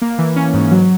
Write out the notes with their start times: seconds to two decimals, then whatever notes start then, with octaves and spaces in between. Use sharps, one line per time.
0.02 A#3
0.18 E3
0.36 C#4
0.54 G#2
0.71 F#3